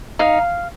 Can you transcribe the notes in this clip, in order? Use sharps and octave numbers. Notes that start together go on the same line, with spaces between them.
D#4 F5